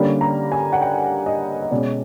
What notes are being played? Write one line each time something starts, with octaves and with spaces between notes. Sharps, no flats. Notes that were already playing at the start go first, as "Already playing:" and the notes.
Already playing: D3 G3 A#3 C#4
A#5
G#5
F#5
G5
D#5
D#5
B2 G#3 C#4 D5